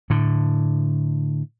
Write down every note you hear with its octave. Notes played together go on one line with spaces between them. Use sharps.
A2 D3